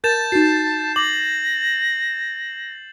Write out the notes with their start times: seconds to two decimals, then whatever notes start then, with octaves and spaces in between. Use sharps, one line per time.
0.04 A#4 A5 G6 A6 E7
0.32 D#4 F#4 C7
0.96 D6 A#6 F#7